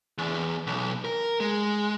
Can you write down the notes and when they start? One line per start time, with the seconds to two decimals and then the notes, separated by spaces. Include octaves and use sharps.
0.18 E2
0.67 B1
1.05 A#4
1.40 G#3